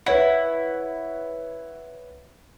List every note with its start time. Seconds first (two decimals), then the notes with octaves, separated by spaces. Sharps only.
0.06 E4 B4 C#5 F#5